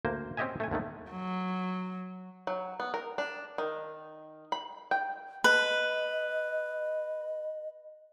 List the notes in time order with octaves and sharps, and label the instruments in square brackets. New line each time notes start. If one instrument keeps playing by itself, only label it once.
[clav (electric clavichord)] D2 A#3 C5
C4 C#4 G4 D#5 E5 G#5
A3 A4 G#5
D#2 D3 D#3 A3
[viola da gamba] F#3
[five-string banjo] F#3
B3
A#4
D4
D#3
B5
G5
[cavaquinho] B4 [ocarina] D#5